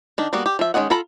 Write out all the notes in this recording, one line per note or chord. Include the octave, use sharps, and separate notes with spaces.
D#3 D4
G3 A#3 B3 F#4
G4
F3 E5
D#3 G#3 C#4 D#5 F#5
F4 A4 A#5 B5